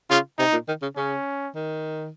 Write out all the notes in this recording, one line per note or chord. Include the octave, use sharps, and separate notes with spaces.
C#3 F4
C3 D#4
A#2
D#3
C#3
C#3 C#4
D#3